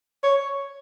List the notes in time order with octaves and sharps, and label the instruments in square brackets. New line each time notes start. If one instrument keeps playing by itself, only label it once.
[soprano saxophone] C#5